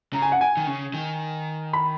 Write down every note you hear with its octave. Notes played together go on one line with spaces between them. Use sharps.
C#3 A#5
G#5
F#5
G#5
D#3
C#3
D#3
B5